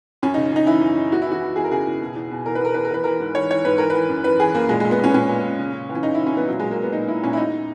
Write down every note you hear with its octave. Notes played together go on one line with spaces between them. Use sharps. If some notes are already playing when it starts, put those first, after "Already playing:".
F#2 C#4
C#3 D#4
F#2 D#4
E3 E4
F#2
F#2
E2 F#4
E4
E3 F#4
E3
E2 G#4
A#4
C#3 G#4
E2
B2
E2
B2
E2 A#4
B4
E2 A#4
E2 B4
A#4
E3 B4
E3 A#4
G#2
E3 C#5
E3 C#5
G#2 B4
E3 A#4
E3 B4
F#2
E3 B4
E3 G#4
F#2 A#3
A#2 G#3
A#2 G#3
B3
A#2 C#4
B3
A#2 C#4
A#2
A#2
C#3
C#3
E3
C#4
C#3 D#4
E2 E4
C#4
E3 B3
A#2 F#3
A#2 G#3
A#3
A#2 B3
A#2 D#4
A#2 E4
A#2 C#4
E4
E2 D#4